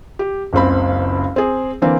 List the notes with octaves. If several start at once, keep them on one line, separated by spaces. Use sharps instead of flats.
G4
F#1 C#2 C4 B5
C4 G#4
D3 E3 A#3 C4